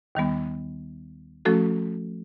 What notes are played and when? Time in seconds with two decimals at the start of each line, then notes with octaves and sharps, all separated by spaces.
0.15 D#2 D#3 G3 B3
1.45 F3 A3 C#4 F#4 A4